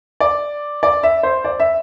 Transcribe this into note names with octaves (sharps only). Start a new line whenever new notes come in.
D5
D5
E5
C5
D5
E5